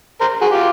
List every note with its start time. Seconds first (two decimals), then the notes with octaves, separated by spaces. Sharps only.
0.21 A#4 C5
0.41 F#4 G#4
0.51 F4 G4